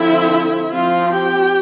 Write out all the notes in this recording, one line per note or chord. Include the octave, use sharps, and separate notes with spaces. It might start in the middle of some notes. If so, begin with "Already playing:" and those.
Already playing: D3 F3 C4 E4 E5
F3 C4 F4 F5
G4 G5